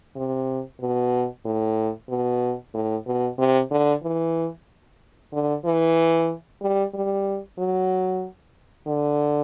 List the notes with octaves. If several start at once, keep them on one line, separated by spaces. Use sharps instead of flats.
C3
B2
A2
B2
A2
B2
C3
D3
E3
D3
E3
G3
G3
F#3
D3